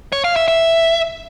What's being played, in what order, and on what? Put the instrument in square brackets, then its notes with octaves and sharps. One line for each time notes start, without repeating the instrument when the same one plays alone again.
[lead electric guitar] C#5
F5
E5
E5